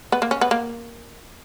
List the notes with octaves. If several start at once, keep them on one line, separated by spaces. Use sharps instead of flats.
B3
A#3
C#4
B3
A#3